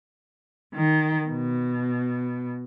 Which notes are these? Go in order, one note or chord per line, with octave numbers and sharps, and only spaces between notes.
D#3
B2